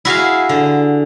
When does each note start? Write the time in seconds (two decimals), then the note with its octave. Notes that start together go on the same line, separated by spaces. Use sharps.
0.05 E4 F#4 G#4 F5
0.49 D3